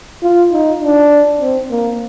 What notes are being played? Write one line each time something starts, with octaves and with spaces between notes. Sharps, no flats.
F4
D#4
D4
C4
A#3